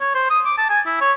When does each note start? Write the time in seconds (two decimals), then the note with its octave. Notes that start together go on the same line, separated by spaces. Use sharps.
0.01 C#5
0.15 C5
0.30 D#6
0.45 D6
0.58 A5
0.69 G#5
0.86 E4
1.01 C#5